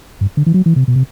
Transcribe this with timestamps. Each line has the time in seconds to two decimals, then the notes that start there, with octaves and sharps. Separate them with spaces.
0.21 G2
0.37 D3
0.46 E3
0.54 F#3
0.66 E3
0.76 C3
0.88 B2
0.96 C3